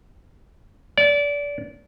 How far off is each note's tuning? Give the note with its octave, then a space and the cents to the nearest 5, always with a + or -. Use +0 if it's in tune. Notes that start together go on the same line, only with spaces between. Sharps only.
D5 -25